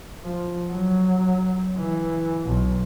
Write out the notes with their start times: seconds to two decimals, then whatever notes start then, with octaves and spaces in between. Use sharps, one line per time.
0.22 F3
0.71 F#3
1.77 E3
2.46 B1